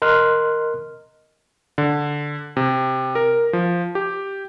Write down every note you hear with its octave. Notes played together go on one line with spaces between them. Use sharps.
A#4 D#5 C6 F6 F#6
D3
C3
A#4
F3
G4